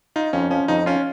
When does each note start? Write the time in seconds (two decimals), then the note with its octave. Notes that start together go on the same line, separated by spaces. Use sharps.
0.16 D#4 F4
0.33 F2 C#4
0.51 F3 C#4
0.68 F2 D#4
0.86 C#4 F4